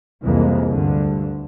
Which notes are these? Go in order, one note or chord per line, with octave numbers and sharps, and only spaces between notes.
C2 F2 E3 G#3 A#3
D2 G2 D3